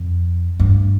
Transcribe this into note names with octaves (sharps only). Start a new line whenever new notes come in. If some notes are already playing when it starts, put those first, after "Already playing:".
Already playing: F2
G2